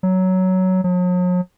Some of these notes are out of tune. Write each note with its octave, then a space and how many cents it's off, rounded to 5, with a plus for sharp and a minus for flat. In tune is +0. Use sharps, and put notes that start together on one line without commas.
F#3 +10
F#3 -45